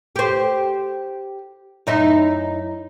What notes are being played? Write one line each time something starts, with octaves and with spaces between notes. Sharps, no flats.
G4 C5
F#2 D#4 E4